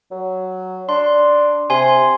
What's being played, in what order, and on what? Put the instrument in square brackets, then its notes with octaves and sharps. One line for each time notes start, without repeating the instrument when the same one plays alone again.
[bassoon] F#3
[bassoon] D4 [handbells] C6
[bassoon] C3 [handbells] G#5 C6